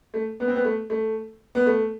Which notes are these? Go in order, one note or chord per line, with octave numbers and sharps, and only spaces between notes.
A3
B3
C4
B3
A3
A3
B3
A3